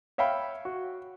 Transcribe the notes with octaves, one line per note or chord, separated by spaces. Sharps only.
C#5 E5 F5 G5 B5
F#4